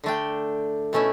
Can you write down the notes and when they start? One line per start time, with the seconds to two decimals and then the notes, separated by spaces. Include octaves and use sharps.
0.04 D3 A3 D4 G5
0.93 B2 A3 C#4 E4